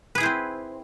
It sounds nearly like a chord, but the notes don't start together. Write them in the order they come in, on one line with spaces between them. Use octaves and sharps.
B4 G#4 E4 C5 C4